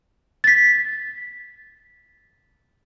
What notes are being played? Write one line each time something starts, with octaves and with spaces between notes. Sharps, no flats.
A6 B6